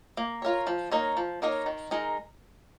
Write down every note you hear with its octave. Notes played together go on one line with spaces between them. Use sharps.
A#3
F4 A#4 C#5
F3
A#3 D#4 A#4 C#5
F3
A#3 D#4 A#4 C#5
D#3
G#3 D#4 A#4